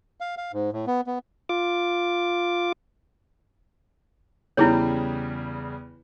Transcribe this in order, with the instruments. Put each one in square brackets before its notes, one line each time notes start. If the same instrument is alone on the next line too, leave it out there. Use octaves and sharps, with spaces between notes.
[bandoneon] F5
F5
G#2
A2
B3
B3
[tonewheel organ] F4 D6
[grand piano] E2 C#3 G3 [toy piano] E4 G#4 C#5